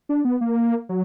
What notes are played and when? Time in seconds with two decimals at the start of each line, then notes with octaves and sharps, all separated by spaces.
0.09 D4
0.25 B3
0.41 A#3
0.89 F#3